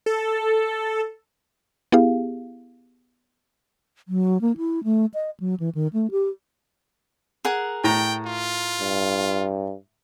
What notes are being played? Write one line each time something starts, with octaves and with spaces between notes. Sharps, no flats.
A4
B3 E4 G4 G#4 F5
F#3
A#3
E4
A3
D#5
F#3
E3
D#3
A3
G4
G#4 A#4 F#5
A2 G5 A#5
F4
G2